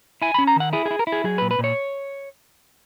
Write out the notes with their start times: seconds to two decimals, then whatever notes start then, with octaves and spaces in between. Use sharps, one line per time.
0.22 E4 G#5
0.34 C#4 B5
0.47 A#5
0.56 D#3 F#5
0.73 E4 G#4
0.86 G#4
0.91 E4
0.99 A#4
1.07 E4
1.12 G#4
1.24 F#3 G#4
1.38 A#2 B4
1.51 B4
1.59 A#2
1.64 C#5